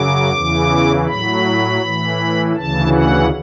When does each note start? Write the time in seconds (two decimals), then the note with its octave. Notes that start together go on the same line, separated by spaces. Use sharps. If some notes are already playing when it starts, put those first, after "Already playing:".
Already playing: F#2 C#3 F#3 D6
0.32 E2 C#3 E3
1.07 A2 F#3 B5
1.82 A2 E3
2.56 D2 C#3 E3 A5
2.93 F#5